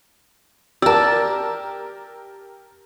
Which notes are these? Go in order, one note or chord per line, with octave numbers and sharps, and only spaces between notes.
G4 A#4 D5 A5 E6